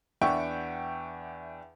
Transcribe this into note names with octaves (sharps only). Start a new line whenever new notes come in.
E2 D4 E5 F#5 G5 C#6